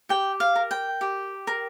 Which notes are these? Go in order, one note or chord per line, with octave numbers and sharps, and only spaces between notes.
G4 G5
F5
A#4
G5
G4
A#4